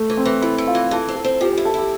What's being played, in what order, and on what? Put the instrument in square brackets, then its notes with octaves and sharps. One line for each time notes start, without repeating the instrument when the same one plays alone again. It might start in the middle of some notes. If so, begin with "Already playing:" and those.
Already playing: [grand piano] A3
[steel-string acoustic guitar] E3
[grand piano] C4
[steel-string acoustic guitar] E3
[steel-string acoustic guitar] A3 [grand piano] E4
[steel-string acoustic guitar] A3
[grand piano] F4
[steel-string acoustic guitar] E3
[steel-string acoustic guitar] E3 [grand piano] A4
[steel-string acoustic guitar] C4
[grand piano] A4
[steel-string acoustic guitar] C4
[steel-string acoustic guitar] F3 [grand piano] G4
[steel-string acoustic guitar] E4 [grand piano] G4
[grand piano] A4
[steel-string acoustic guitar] E4 [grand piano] G4